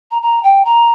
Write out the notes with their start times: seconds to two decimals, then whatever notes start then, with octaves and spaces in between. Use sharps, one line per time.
0.11 A#5
0.22 A#5
0.43 G5
0.65 A#5